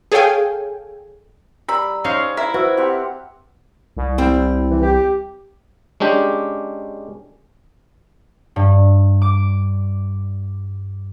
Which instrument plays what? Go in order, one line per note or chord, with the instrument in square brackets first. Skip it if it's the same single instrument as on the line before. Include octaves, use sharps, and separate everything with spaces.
[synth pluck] G#4 A4 C#5 F5 G5 G#5
[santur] G3 [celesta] A#5 E6 [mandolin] B5
[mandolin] C#4 [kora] D#4 C5 F5
[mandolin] E4 [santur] A#4
[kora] F#4 [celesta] B4 C5 E6
[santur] C4 G4 F#5
[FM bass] C2
[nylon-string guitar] G3 C4 E4
[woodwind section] E3
G4
[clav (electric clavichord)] G#3 C#4 D4 G4
[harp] G2
D6